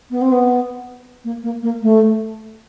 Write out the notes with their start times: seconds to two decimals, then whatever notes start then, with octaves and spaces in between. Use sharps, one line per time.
0.10 B3
0.21 C4
0.32 B3
1.24 A#3
1.43 A#3
1.62 A#3
1.82 A3